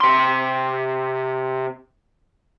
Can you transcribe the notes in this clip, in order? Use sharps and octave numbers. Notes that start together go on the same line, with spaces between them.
C3 C6